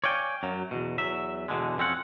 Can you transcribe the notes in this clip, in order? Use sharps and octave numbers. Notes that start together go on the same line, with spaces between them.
C#5 D5 F5 G5 G#5
F#2 F#3
E2 B2
E2 F#3 E5
E2 B2 D3 G#3
F2 C4 C#4 F#5